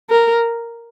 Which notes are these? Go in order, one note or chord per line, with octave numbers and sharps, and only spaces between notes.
A#4